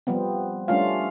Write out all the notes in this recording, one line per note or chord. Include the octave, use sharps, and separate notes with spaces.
F3 G3 B3 C4
G3 A3 C#4 D4 F4 F5